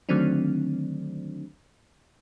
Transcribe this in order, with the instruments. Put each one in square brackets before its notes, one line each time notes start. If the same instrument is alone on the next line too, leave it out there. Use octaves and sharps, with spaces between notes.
[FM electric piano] D3 D#3 F#3 A3 C4 D4